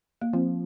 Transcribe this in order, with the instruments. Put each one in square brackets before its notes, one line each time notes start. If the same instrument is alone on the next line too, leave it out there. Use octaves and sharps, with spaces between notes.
[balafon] A#3
[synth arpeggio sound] F3 [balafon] C4